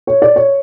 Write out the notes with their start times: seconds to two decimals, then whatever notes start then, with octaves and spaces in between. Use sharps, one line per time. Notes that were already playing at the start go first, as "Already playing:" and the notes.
0.07 C#5
0.22 D5
0.36 C#5